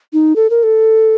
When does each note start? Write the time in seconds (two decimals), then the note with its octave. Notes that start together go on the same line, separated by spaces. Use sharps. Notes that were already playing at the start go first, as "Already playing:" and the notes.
0.13 D#4
0.36 A4
0.50 A#4
0.63 A4